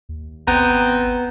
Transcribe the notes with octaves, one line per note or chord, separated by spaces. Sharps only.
D#2
G#1 B3 C4 A#5